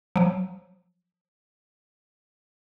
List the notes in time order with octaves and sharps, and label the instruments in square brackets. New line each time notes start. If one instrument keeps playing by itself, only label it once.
[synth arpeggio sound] F3 F#3